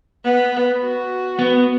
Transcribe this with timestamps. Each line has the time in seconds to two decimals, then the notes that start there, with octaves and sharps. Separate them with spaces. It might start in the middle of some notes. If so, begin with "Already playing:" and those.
0.25 B3
0.84 F#4
1.39 B3